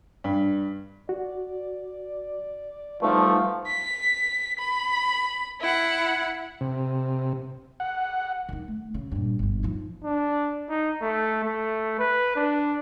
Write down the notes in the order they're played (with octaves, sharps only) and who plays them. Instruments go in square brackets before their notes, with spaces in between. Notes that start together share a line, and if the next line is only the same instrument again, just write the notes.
[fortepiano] G2
[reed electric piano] F#4 [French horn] D5
[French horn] E2 [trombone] F3 [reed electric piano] G3 D#4 B4 [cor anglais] A3
[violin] B6
B5
E4 F#5
[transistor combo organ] C3
F#5
[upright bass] D#3 D#4
A3
C#3
G2 A#2
G1 G2
F3 D#4
[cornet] D4
D#4
A3
A3
B4
D4